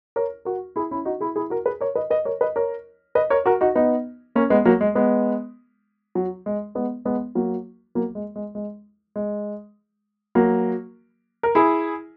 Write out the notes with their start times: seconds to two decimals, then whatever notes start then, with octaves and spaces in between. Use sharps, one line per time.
0.16 A#4 C#5
0.45 F#4 A#4
0.76 E4 G#4
0.91 C#4 E4
1.05 D#4 F#4
1.20 E4 G#4
1.36 E4 G#4
1.50 F#4 A#4
1.66 G#4 B4
1.81 A#4 C#5
1.95 B4 D#5
2.10 B4 D#5
2.25 A#4 C#5
2.41 B4 D#5
2.56 A#4 C#5
3.15 B4 D#5
3.30 A#4 C#5
3.46 F#4 A#4
3.61 D#4 F#4
3.75 B3 D#4
4.35 A#3 C#4
4.50 G#3 B3
4.65 F#3 A#3
4.81 G#3
4.95 G#3 B3
6.15 F#3
6.46 G#3
6.75 G#3 B3
7.05 G#3 B3
7.35 F#3 A#3
7.95 F#3 A#3
8.15 G#3
8.36 G#3
8.55 G#3
9.16 G#3
10.35 F#3 A#3
11.43 A#4
11.55 E4 G#4